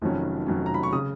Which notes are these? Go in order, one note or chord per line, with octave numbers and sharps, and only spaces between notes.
F1 F2 D#3 F#3 C#4
F1 F2 D#3 F#3 C#4
A#5
B5
C#6
C#3 D#6